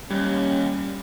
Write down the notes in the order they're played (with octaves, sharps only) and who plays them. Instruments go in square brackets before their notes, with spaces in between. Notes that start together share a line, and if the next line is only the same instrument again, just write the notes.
[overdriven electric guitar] D#2 [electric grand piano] G3 [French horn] C#4